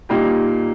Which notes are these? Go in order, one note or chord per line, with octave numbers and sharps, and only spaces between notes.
A#2 G3 A#3 D#4 G4